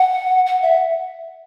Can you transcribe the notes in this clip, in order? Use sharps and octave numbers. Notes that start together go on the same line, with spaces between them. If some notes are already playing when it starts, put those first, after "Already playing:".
Already playing: F#5
F#5
E5